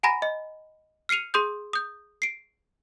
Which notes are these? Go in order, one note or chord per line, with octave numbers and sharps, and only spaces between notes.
F#5 G#5 A#5 B5 A#6
D#5
F6 C7 C#7 D#7 F7
G#4 C6 D#6 G6
D#6 G6
C7 D7